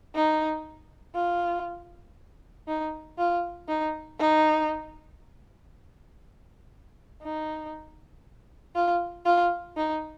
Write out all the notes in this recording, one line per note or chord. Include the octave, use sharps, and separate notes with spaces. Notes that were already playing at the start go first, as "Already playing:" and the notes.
D#4
F4
D#4
F4
D#4
D#4
D#4
F4
F4
D#4